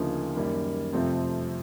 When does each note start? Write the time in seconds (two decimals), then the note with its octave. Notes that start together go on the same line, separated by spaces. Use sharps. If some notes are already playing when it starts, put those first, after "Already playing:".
Already playing: D2 C#3 F3 A#3 D#4
0.36 F#2 D#3 G3 A#3
0.93 F2 C3 F3 A3 C4